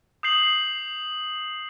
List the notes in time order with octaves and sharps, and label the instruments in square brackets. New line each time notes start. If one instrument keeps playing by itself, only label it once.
[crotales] D#6 G6 C7 F#7